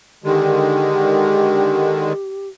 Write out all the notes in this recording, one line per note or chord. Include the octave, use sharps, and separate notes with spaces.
D3 D#3 G#3 G4